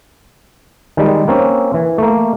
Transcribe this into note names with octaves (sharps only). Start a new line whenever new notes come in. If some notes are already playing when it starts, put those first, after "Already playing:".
D#3 G3 G#3
A#3 C4 C#4
E3
A3 A#3